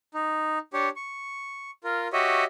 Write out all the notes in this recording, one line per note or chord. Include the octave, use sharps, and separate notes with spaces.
D#4
D4 G4 C#5
C#6
F4 A#4
F#4 G4 C#5 D#5 E5